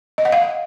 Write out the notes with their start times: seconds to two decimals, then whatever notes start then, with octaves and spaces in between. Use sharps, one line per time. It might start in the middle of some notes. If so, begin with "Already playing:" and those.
0.18 D#5
0.25 F#5
0.32 F5